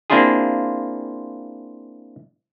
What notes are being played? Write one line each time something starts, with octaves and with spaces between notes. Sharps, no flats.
A#3 C4 D4 E4 F4 G#4